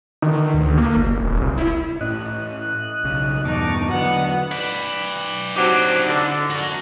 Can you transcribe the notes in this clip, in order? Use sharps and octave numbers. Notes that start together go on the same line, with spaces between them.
D#3
D2
A#3
F#1
D#1
C2
E4
A2 C#4 D#5 F#6
B1 C#3
E2 G2 B2 D#4 A5 C#6 D6
D3 F#3 B3 D#5 F#5
B4 D5
F#3 C4 D4 D#4 G4
D3
F#4 A#4